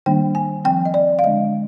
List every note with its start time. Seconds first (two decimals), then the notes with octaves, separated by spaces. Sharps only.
0.06 D#3 G3 A#3 D4 G5
0.35 G#5
0.65 F3 C4 G5
0.85 D#5
0.94 D5
1.19 F5
1.24 D3 G#3 D4 D#5